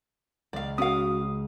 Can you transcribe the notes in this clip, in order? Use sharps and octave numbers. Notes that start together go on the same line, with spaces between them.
C#2 D5 F5
C#4 F#4 F5 D#6